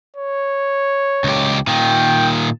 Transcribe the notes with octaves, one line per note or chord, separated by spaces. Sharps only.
C#5
C#2 G4
A#2 D#3 G5